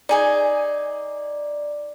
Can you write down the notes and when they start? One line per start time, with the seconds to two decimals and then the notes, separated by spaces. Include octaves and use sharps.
0.09 D#4 G#4 D5 G#5